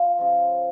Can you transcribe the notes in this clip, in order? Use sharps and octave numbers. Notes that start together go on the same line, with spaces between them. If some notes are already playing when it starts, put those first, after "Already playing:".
Already playing: F4
C#3 F3